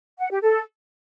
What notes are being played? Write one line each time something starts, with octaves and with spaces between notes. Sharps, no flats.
F#5
G4
A4